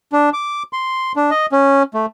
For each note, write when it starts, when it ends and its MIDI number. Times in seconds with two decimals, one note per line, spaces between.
0.13 0.30 62
0.33 0.63 86
0.73 1.12 84
1.16 1.30 62
1.31 1.46 75
1.52 1.83 61
1.94 2.06 57